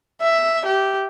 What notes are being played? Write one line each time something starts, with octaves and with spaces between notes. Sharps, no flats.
E5
G4